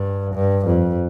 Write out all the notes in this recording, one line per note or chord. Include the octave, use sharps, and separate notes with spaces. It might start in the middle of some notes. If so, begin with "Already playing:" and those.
Already playing: G2
G2
F2